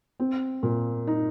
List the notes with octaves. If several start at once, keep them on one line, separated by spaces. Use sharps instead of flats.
C4
A#2
D#4